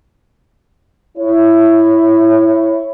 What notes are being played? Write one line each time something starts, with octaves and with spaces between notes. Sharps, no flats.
E4 C#5